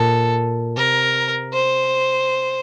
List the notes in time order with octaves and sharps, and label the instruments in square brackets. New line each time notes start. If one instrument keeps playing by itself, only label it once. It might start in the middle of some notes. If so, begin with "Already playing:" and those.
Already playing: [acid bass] A#2 [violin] A4
[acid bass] C3 [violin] A#4
[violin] C5